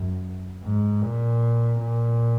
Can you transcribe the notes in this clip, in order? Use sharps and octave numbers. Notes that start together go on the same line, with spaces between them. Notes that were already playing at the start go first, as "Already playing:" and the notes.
Already playing: F#2
G#2
A#2
A#2